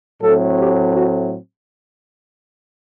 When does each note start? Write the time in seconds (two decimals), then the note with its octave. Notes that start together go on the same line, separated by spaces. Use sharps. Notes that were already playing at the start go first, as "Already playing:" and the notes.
0.21 A2 F#3 A3 C4 A4
0.57 G4
0.93 F#4